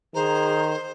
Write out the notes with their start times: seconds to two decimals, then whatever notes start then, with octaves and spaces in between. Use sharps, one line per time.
0.14 D#3 G#4 C5 A#5